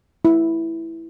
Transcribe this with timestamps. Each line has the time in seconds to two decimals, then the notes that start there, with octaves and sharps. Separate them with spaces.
0.25 E4